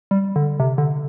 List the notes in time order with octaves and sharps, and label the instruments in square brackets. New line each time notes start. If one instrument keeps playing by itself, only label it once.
[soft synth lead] G3
D3
C3
D3